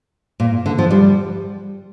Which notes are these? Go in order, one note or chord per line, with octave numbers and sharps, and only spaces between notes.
A#2
D3
F3
G3